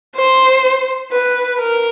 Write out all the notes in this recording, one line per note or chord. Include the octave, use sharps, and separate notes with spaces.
C5
B4
A#4